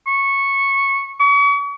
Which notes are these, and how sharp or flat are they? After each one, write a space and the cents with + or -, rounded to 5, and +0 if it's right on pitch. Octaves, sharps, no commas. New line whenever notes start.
C#6 -10
C#6 +40